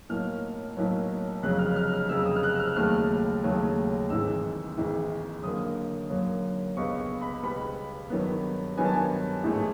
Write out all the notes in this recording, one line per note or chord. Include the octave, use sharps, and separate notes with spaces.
B1 A2 F#3 A#3 F6
B1 A2 F#3 A#3
F1 F2 C#3 F#3 F#6
F6
F6
F6
F1 F2 C#3 F#3 E6
D#6
F6
F#6
E6
F6
D#2 C#3 F#3 A3 F6
D#2 C#3 F#3 A3
G#1 G#2 E3 E6
G#1 G#2 E3
F#2 D3 F#3 A#3 D#6
F#2 D3 F#3 A#3
C#2 B2 G3 B3 C#6
C#6
B5
C#2 B2 G3 B3 B5
G2 D#3 F#3 B3
G2 D#3 F#3 B3 G#5
A5
G#5
A1 G#2 E3 A3